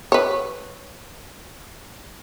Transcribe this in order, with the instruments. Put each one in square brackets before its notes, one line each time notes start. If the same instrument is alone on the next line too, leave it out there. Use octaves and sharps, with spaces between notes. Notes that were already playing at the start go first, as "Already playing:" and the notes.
[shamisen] B4 C#5